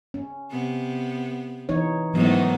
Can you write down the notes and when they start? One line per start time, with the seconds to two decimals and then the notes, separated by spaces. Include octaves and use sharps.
0.14 C#4
0.51 C3 B3
1.69 E3 D#4 C#5
2.14 G#2 D#3 E3 F#3 A3 B3